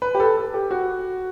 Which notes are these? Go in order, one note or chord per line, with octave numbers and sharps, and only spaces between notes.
B4
G4
A4
A4
G4
F#4